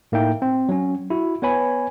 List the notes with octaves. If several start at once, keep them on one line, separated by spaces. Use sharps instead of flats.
A2 A#3 D#4 E5 G5
C4
F#3 C#4
E4 F#4
B3 B4 C#5 G#5 B5